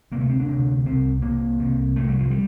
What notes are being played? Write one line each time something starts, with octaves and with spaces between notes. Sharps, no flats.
D2 C3 A#3
A3
C4
D4
D2 C3
C2 C3 C4
C2 C3 A#3
C2 C3
C2 C3 A3
G3
F3
G3